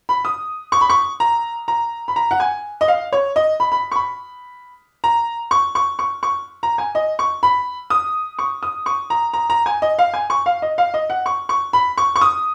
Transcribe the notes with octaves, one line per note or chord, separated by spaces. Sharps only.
B5
D#6
C#6
B5
C#6
A#5
A#5
B5
A#5
F#5
G#5
D#5
F5
C#5
D#5
B5
B5
C#6
B5
A#5
C#6
C#6
C#6
C#6
A#5
G#5
D#5
C#6
B5
D#6
C#6
D#6
C#6
A#5
A#5
A#5
G#5
D#5
F5
G#5
C#6
F5
D#5
F5
D#5
F#5
C#6
C#6
B5
C#6
C#6
D#6